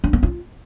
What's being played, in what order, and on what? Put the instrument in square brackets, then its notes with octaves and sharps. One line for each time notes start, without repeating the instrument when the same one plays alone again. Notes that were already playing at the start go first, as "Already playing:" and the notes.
[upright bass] D4
B3
F4